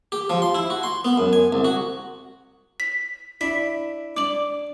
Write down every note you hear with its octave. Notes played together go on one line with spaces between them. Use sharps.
G4
F3
C6
E4
F#4
C6
B3
F#2
G#5
C2
F#4
B6
D4 E4 B6
D4 D5 D6 F#7